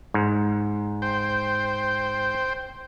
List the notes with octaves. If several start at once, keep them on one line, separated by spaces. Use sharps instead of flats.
G#2
C5 G5